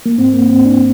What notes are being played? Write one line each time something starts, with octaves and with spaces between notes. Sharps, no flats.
A#3
G#2 C4
A#3
G#2 C4
D4